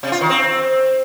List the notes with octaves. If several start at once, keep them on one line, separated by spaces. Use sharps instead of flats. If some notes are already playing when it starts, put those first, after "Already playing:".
C3
F4
D#3
C4